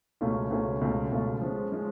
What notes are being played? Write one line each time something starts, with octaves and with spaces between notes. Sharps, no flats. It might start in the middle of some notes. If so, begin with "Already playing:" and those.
C#2 B2 A3 C#4 F4
C#2 B2 A3 C#4 F4
C#2 B2 A3 C#4 F4
C#2 B2 A3 C#4 F4
F3 G#3 C#4
F3 G#3 C#4